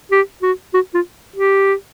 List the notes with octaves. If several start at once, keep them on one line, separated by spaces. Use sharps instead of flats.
G4
F#4
F#4
F4
G4